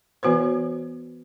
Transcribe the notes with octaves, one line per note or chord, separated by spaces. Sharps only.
E3 B3 F#4 B4 C5